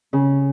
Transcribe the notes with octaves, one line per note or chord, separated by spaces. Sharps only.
C#3